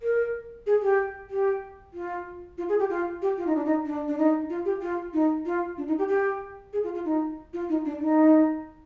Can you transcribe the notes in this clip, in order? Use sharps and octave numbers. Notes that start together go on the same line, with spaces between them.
A#4
G#4
G4
G4
F4
F4
G#4
G4
F4
G4
F4
D#4
D4
D#4
D4
D4
D#4
F4
G4
F4
D#4
F4
D4
D#4
G4
G4
G#4
F4
F4
D#4
F4
D#4
D4
D#4